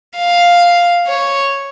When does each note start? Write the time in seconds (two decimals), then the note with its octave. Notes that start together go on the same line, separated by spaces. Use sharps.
0.17 F5
1.07 C#5